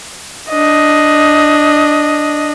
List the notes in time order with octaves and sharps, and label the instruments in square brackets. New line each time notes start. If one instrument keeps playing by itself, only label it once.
[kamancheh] D4 D#5